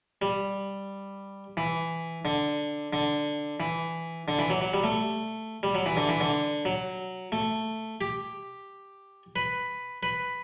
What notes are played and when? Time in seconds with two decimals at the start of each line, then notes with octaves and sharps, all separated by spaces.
0.22 G3
1.57 E3
2.25 D3
2.93 D3
3.60 E3
4.28 D3
4.39 E3
4.50 F#3
4.61 F#3
4.74 G3
4.84 A3
5.63 G3
5.75 F#3
5.86 E3
5.97 D3
6.09 E3
6.20 D3
6.65 F#3
7.32 A3
8.01 G4
9.36 B4
10.03 B4